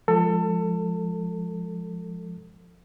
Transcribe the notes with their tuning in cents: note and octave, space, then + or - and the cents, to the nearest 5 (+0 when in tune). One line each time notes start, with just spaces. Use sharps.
F3 +0 G#3 +0 A4 +25